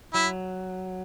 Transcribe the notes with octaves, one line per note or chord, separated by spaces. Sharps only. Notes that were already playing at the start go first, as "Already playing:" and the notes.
F#3 E4